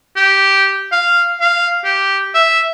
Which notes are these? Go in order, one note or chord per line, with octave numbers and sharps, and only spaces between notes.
G4
F5
F5
G4
E5